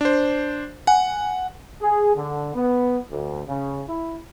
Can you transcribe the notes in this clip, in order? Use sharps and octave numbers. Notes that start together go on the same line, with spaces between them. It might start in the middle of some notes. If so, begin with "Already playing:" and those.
D4 C5
F#5 G#5
G#4
D3
B3
D2
C#3
E4